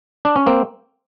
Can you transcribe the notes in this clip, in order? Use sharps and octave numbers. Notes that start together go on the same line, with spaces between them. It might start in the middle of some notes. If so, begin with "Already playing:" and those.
D4
C#4
A#3 C4